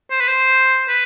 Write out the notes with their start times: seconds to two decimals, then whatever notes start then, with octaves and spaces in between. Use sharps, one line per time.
0.11 C5
0.20 B4
0.28 C5
0.89 B4